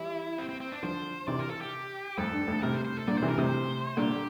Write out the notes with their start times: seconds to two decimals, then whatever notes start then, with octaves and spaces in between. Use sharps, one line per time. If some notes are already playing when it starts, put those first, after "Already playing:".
Already playing: E3 G3 E4
0.38 C4
0.49 C4
0.60 C4
0.72 D4
0.83 D3 F3 C5
1.28 C3 E3 D5
1.39 A#4
1.50 A4
1.61 G4
2.18 F2 A2 A4
2.33 G2
2.48 F2 A2
2.63 A2 C3 A#4
2.74 C5
2.85 C5
2.97 A4
3.08 A#2 D3 D5
3.18 C3 E3 C5
3.28 A#4
3.37 A2 C3 C5
3.97 A#2 D3 G4